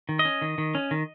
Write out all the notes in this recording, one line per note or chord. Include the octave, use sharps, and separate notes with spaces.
D#3
D#5
C#4
D#3
D#3
C#4
D#3